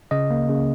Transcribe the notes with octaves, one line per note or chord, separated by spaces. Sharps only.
C#3 D#5
A#3
C#3